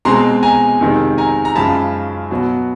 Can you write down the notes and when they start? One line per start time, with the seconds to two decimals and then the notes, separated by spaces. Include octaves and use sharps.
0.05 B2 G#3 C4 A#5 C6
0.43 G#5 A#5
0.80 F2 C3 D#3 G#3 C4
1.18 G#5 A#5
1.45 A#5
1.55 F#2 C#3 F3 G#3 A5 B5
2.31 B2 F#3 B3